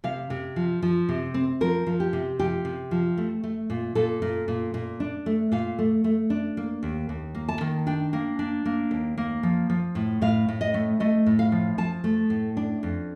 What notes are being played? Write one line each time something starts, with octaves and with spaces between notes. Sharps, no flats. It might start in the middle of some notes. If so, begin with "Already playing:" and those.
C3 F5
C3
F3
F3
C3
C4
F3 A#4
F3
G4
C3
F3 G4
C3
F3
A3
A3
A#2
A#2 A4
A#2
A#2
A#2
D4
A3
A#2 F5
A3
A3
D4
A#3
D#2
D#2
A#3
A5
D#3
D4 G5
A#3
D4
A#3
D#2
A#3
F3
F3
A2
A2 F5
A2
D#5
A3
A3 D#5
A2
F5
F3
F3 A5
A3
A2
D4
F2